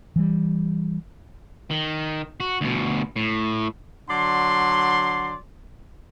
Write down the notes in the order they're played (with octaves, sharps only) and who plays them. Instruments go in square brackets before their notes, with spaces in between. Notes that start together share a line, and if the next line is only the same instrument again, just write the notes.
[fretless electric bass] E3 G3
[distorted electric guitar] D#3
F#4
D2 B2
A2
[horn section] D3 F#3 D5 C6